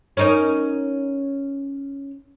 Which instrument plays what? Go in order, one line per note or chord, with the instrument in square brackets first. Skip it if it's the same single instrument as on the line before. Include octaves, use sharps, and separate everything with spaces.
[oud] C#4 D#4 A#4